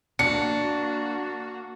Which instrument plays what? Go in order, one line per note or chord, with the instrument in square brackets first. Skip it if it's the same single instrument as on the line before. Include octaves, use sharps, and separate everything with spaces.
[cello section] A#3 F#4 [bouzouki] D4 [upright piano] C#7